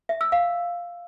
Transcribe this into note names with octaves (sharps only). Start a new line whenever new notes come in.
E5
E6
F5